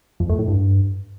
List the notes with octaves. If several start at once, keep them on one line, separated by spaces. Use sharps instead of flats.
F2
A3
A2
G2